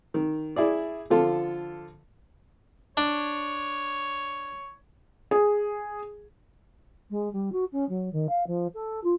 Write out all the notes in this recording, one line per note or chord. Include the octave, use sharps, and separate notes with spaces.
D#3
E4 G#4 D5
D3 F3 F4 A4
D4 C#5
G#4
G#3
G3
F#4
C#4
F#3
D#3
F5
F3
A4
F4